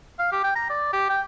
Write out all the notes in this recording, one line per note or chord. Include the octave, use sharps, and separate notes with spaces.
F5
G4
G5
A#5
D5
G4
G5